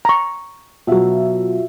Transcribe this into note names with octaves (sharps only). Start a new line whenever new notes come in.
A#5 C#6
B2 F#3 F4 F#4 E5